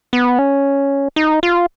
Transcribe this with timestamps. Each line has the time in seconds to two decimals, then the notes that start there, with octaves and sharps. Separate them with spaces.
0.13 B3
0.39 C#4
1.16 D#4
1.43 F4